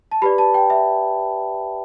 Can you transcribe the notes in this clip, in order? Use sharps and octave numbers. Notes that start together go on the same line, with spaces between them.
A5
G4 B4 D5 B5
A5
G5
E5